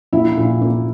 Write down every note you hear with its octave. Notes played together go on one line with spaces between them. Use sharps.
A#1 E4 E5
A#2
A#3